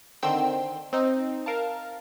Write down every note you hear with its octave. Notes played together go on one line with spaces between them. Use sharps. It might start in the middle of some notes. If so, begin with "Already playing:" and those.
D3 D#3 C4 G5 C6 E6
C4 D#4
A#4 F5 A5